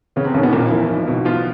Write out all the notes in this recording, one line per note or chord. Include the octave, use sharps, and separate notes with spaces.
C#3 B3 C#4
C3 C4
D#2 C#3 C#4
B2 B3
F1 A#2 A#3
E3 F3 E4
B1
B2
F3 B3 F4